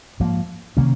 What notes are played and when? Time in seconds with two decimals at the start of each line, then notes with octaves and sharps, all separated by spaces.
0.20 G#2 F3 A#3
0.77 C3 D#3 A#3 C#4